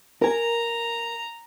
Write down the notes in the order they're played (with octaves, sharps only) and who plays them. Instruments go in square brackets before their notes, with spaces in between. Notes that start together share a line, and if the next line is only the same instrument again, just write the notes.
[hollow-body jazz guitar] A#4 G#5 [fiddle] A#5